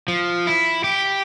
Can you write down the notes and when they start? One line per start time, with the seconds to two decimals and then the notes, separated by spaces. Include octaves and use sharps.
0.08 F3
0.47 E4
0.84 G4